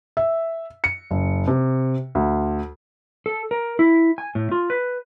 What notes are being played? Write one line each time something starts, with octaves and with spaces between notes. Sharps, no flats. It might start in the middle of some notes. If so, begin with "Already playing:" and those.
E5
C#7
F#1
C3
D2
A4
A#4
E4
G#5
A2
F4
B4